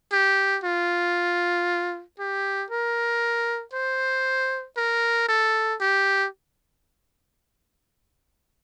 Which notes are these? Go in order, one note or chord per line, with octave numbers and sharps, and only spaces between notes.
G4
F4
G4
A#4
C5
A#4
A4
G4